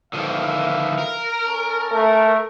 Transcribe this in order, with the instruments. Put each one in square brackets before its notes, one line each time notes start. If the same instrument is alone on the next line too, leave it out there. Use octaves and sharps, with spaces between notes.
[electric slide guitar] D3 D#3 F3 [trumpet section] B4 E5 F5
[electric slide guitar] A#4
[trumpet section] C#4 A4 A5
[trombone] A3